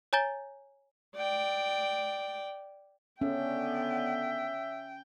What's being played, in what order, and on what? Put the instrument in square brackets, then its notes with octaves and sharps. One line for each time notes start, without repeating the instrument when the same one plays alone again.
[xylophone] C#5 G#5 A#5 G6 A6 G7
[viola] D5 G5
[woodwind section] D3 B3 [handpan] C#4 [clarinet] E5 [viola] G5